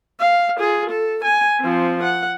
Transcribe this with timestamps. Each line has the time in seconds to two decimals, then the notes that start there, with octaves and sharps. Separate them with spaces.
0.20 F5
0.59 F4 G#4
0.90 A4
1.24 G#5
1.60 F3 C4
2.03 F#5